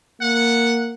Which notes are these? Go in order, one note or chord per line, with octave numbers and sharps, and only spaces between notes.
A#3 F#5